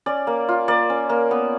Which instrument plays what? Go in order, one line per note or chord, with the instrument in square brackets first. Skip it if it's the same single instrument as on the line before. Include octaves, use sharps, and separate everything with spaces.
[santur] C#4 D5
A#3
F4
A#3 D5
C#4
A#3
B3